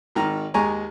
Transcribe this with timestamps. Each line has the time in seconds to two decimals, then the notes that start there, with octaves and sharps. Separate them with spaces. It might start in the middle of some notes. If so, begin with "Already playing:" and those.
0.15 G#1 D#3 A#5
0.54 D#2 G#3 G#5 A#5 C#6